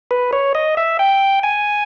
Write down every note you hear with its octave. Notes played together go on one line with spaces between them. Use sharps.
B4
C#5
D#5
E5
G5
G#5